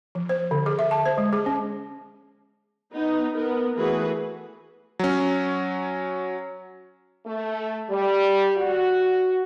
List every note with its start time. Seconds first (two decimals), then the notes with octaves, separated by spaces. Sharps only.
0.15 F3
0.29 C5
0.51 D3
0.66 G#4
0.79 E5
0.91 A5
1.06 C5
1.18 G#3
1.33 G#4
1.46 C#4
2.94 B3 D#4
3.35 B3 A#4
3.78 E3 A3 F#4 G#4 B4
4.99 F#3 C#4
7.24 A3
7.88 G3
8.56 F#4